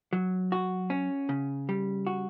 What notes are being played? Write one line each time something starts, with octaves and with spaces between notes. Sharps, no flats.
F#3
F#4
C#4
C#3
G3
F#4